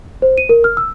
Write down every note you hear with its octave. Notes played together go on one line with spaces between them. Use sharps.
C5
D#7
A#4
F6
E6